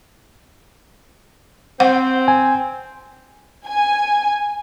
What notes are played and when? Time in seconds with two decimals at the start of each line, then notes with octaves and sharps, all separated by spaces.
1.80 C4 F#5
2.28 G#5
3.67 G#5